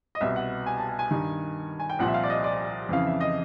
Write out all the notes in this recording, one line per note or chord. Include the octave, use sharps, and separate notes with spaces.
D#5
C2 B2 E5
F#5
G#5
A5
G#5
G#5
G2 D#3
G#5
G5
C2 A#2 F3 F#5
E5
F5
D5
D#5
D5
F2 C#3 E3 F5
E5
D#5